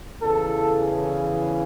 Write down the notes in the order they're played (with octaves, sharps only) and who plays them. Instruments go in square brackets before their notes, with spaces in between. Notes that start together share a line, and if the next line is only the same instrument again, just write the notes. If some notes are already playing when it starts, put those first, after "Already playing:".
[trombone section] E2 C#3 E3 A4
G#4